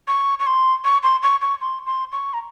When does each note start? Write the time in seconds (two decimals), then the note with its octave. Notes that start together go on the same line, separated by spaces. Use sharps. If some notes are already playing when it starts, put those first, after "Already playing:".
0.08 C#6
0.40 C#6
0.47 C6
0.84 C#6
1.03 C6
1.23 C#6
1.42 C#6
1.61 C6
1.86 C6
2.12 C#6
2.33 A#5